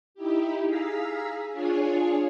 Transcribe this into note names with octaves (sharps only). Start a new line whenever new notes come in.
D#4 E4 G4
G#4 F5 A#5 E6 B6
D4 F4 G#4 C#5 G#5